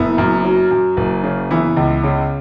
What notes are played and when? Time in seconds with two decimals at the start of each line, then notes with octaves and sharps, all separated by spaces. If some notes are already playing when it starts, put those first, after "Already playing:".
Already playing: F#1 B3 E4
0.18 F#2
0.45 F#3
0.71 F#2
0.97 F#1
1.24 C#3
1.50 E3 B3 E4
1.77 C#2
2.04 C#3